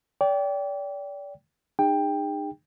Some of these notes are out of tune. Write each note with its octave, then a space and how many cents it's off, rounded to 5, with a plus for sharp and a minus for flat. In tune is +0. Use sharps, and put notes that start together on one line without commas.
D5 -35 G5 +0
D#4 -40 G#4 -40 G5 +15